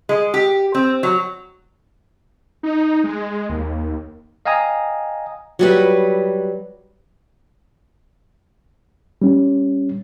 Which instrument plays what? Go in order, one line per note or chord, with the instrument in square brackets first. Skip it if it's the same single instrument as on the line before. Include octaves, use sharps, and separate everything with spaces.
[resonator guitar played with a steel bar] G#3
G4
C4
F#3
[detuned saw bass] D#4
G#3
D#2
[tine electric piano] D#5 F5 G5 G#5 A#5 D#6
[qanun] F#3 G3 B4
[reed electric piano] G3 C#4